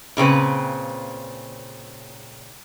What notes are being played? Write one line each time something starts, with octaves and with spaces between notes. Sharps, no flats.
A#2 C#3 C4 B4